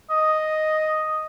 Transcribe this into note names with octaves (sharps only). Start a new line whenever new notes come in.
D#5